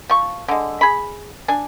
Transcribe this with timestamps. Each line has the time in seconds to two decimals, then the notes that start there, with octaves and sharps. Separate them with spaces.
0.09 F3 C#6
0.48 D3 G#3
0.81 G#4 B5
1.48 D4 G#5